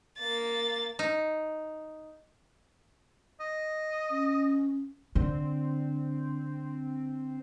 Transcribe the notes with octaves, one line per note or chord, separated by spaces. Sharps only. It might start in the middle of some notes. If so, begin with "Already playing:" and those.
A#3 A6
D#4
D#5
C#4
D3 C4